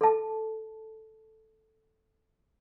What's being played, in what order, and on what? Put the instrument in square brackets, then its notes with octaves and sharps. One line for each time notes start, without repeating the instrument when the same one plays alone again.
[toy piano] A4 A5